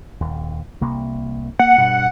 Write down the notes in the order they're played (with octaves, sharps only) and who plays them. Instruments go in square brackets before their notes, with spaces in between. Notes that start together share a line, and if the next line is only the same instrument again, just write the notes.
[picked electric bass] D#1 D#2
C2 C3 A#3
[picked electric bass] A#3 [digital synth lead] F#5
[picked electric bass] G2 B2